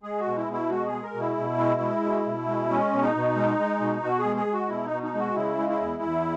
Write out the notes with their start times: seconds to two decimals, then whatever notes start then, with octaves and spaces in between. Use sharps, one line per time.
0.03 G#3 G#4
0.20 F#4
0.26 B2
0.37 E4
0.47 B2
0.53 E4
0.70 G#3 F#4
0.87 G#4
0.92 G#3
1.03 A#4
1.14 B2
1.20 E4
1.37 B2
1.58 G#3
1.80 G#3
2.04 B2
2.26 B2
2.47 G#3
2.70 G#3 C#4
2.93 B2
3.03 D#4
3.15 B2
3.36 G#3
3.58 G#3
3.80 B2
4.02 B2 F#4
4.19 G#4
4.25 G#3
4.36 G#4
4.47 G#3
4.53 F#4
4.69 B2 E4
4.86 D#4
4.91 B2
5.03 D#4
5.14 G#3 F#4
5.36 C#3 E4
5.58 G#3
5.69 E4
5.81 E2
6.03 E2